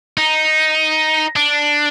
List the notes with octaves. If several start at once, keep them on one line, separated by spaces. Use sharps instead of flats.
D#4
D4